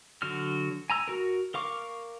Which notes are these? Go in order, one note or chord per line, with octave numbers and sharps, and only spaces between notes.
D3 F#3 F#4 F6
G#5 A#5 E6
F#4 A#4
A#4 F5 C#6 D6